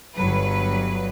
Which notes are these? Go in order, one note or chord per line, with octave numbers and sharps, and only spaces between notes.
G1 F#3 B4